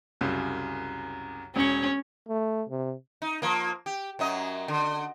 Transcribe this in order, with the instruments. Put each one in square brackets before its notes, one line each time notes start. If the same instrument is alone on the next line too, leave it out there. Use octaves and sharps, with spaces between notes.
[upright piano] C2 F#2 C#3
[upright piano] E1 C#7 [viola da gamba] C#4
[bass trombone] A3
C3
[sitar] D#4
F3 A#3
G4
F#2 F#3 D#5
D3